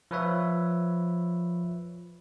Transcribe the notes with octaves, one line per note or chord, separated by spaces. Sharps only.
F3 F4 B4 C#5 E5